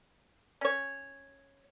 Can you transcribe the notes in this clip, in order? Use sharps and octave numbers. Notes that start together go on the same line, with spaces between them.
C#4 C#5